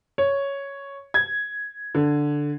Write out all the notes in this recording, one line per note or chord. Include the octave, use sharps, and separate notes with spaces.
C#5
G#6
D3